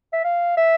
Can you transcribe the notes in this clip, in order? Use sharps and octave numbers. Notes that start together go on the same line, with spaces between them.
E5
F5
E5